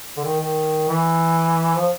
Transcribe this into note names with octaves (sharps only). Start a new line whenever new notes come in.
D3
D#3
D#3
E3
F3